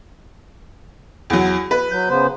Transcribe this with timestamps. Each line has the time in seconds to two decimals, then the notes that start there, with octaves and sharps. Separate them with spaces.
1.30 E2 F#3
1.71 B4
1.92 F#3 G6
2.10 C#3 B3 C5